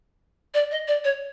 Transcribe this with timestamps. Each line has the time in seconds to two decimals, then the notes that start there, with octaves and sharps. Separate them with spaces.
0.54 D5
0.71 D#5
0.88 D5
1.04 C#5